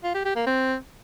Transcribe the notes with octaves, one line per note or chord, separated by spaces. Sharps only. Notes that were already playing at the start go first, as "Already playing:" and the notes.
F4
G4
G4
A#3
C4